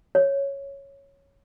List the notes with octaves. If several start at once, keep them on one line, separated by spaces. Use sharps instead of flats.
C#5